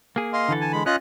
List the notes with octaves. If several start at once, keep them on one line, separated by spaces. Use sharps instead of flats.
A#3 G#4
D#5 F5 C6
D3 E3 A4
G#5 A5
G#3 B5
C#4 F4 D#5 F#6